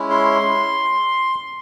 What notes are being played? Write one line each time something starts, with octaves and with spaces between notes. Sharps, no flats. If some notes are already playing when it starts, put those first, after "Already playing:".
Already playing: G#3 C#4 E4
C6